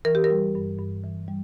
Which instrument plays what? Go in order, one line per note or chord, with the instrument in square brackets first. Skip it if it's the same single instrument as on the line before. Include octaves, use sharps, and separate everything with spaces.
[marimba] E3 A#4
G4
A#4
G3
G2
G2
E3
G3